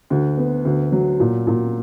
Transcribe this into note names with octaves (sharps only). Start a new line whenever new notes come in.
D2
B3
D2
F#3
A#2
A#2